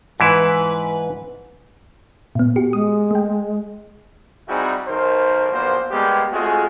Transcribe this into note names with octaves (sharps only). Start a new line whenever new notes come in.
G#2 E3 E4 B4
A#2 B3
F#4 G4
G#3 D#6
A3 G5
G3 C4 D#4 E4 F#4 G#4
B1 D#3 A#4 C5
A#1 A#2 F#3 A#3 B3 C5
G3 G#3 A#3 B3 G4
G#3 A3 C4 F4 F#4 G#4